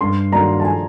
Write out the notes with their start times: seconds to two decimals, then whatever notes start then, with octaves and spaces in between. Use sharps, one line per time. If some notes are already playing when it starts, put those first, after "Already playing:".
0.01 G2 C6
0.32 D#3 F#3 A#3 D4 A#5
0.60 A5
0.64 F3 G#5